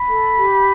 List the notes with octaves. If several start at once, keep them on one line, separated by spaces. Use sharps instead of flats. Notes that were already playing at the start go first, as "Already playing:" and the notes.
Already playing: B5
A4
G4